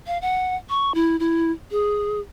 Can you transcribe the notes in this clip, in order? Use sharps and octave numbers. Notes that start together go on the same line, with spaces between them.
F5
F#5
C#6
E4
E4
G#4